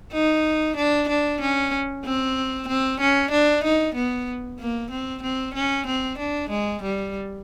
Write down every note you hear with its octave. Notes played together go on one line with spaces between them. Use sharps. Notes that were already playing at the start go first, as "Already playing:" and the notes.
D#4
D4
D4
C#4
C4
C4
C#4
D4
D#4
B3
A#3
C4
C4
C#4
C4
D4
G#3
G3